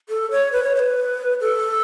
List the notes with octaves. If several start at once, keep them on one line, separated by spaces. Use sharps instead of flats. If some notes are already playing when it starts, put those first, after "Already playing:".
A4
C#5
B4
C#5
C#5
B4
A4